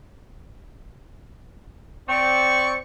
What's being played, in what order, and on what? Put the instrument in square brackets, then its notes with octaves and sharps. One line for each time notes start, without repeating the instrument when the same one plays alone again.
[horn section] C4 D5 [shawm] C#6